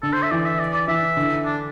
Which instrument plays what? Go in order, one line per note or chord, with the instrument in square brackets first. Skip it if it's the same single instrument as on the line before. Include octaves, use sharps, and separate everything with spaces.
[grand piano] D3 [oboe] A4
[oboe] C5
E5
[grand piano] E3 [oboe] D5
[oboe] E5
D5
D5
[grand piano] E3 [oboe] E5
[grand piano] D3
[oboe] D4